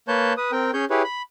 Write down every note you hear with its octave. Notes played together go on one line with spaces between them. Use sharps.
A#3 B4 C#5 A5 G6
B4 D#6
C4 A#4 G5
C#4 G#4 C#5 G6
E4 G4 G#4 B4 C#5
B5